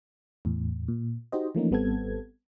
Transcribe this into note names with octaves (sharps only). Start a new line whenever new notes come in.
E2 A2
A#2
D#4 F#4 G4 C5 D#5
E3 F3 A3 A#3 C#4 D#4
G#1 G3 B3 C4 A4 G#6